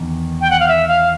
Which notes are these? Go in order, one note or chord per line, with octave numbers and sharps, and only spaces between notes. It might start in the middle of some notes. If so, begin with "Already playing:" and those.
Already playing: E2 D#3
G5
F#5
F5
E5
F5